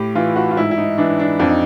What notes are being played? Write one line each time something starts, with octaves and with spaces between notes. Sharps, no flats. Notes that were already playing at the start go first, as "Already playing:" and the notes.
Already playing: A2 G4
E3 F4
F#4
F4
G#2 E4
E4
D#4
E3 D4
D4
F2 D4
D#4